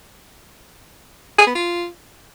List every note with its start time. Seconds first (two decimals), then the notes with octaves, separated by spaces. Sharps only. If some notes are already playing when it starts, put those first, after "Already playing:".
1.38 G#4
1.47 B3
1.55 F4